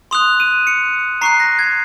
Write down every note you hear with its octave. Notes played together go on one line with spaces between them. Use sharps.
C6 D#6 F#6 F7
D#7
C#7
A#5 C#6 F#6 C7
A#6
G#6